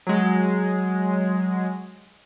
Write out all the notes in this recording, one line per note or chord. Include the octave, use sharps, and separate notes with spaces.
F#3 G#3